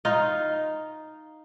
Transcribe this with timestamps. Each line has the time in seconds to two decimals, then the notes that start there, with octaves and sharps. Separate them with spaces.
0.05 D#4 F4